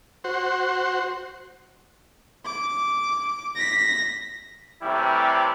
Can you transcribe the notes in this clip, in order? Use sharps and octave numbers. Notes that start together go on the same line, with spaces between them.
F#4 C5
D6
A#6 B6
A2 C3 E3 G3 E4